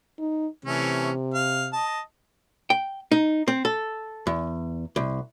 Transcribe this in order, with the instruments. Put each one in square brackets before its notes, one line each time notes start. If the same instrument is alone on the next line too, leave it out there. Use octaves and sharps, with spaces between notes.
[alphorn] D#4
[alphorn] C3 [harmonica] E3 A3 C#4
[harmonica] F5
D#5 A5
[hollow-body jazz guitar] G5
D#4
C4
A4
E2
C2